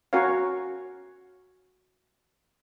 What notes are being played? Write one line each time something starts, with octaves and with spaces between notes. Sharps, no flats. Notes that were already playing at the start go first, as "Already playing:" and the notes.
C#4 F#4 A#4 C#5 F5